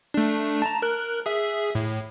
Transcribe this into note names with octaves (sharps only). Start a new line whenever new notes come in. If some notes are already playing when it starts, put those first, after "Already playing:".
A3 D4
A5 A#5
A#4 F#6
G#4 E5
A2